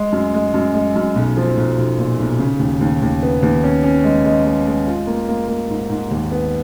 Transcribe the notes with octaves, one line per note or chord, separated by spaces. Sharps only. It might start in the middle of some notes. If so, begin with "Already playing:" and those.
Already playing: G#3
F#2
G#3
F#2
G#3
F#2
B1
F3
B1
B1
A#2
B1
C#3
D#2
D#2
D#2
B3
D#2
C#4
C#4
G#3
G#3
G#3
G#3
F4
A#3
A#3
A#3
G#2
G#2
D#2
B3